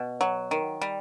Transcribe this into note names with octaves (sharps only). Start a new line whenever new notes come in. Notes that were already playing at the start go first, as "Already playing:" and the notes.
Already playing: B2
F#3
D#3
G3